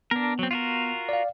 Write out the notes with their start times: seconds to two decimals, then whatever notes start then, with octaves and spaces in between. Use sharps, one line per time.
0.11 B3 D4 A#4
0.39 F#3 C4
0.51 F4 F#4 A#4
1.09 D5 F5